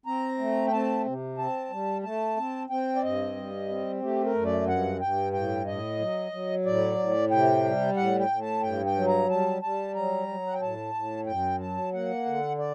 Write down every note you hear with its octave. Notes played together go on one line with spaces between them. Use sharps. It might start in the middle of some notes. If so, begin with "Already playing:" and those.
C4 A#5
A3
G5
C4 A5
C3
C4 A5
G3
A3 A5
C4
C4 G5
D5
G2 D#5
G3
C4
A3 G4
A#4
F#2
D5
G2 F#5
G2 G5
A2 G5
A2 D#5
F#3
F#3
A2 D5
A2
C3 G5
G3
A2 F#5
G5
A2
A5
G2 G5
G5
F#3
A#5
G3 A5
G3 A5
F#3 A#5
F#3
F#5
G5
A2 A5
A2
F#2 G5
F#3 A5
A#3 F#5
D3
D5